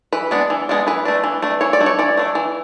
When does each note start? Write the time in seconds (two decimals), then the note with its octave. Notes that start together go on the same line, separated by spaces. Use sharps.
0.13 E3 B4
0.31 G#3 B3 D4
0.50 E3
0.69 G#3 B3 D4
0.87 E3 B4
1.05 A3 D4
1.24 E3
1.42 A3 D4
1.61 E3 C#5
1.73 D5
1.80 A3 D4
1.86 C#5
1.99 E3 D5
2.18 A3 D4
2.35 E3